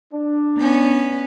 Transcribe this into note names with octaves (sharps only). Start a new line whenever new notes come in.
D4
B3 C#4